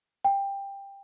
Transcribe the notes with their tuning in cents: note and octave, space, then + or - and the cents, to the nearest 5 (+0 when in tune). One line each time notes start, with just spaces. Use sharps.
G5 +15